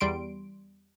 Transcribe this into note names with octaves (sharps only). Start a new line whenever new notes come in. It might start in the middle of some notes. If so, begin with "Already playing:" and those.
E2 G3 C6 D7